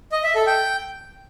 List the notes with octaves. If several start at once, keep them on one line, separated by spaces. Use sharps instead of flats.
D#5
E5
A4
G5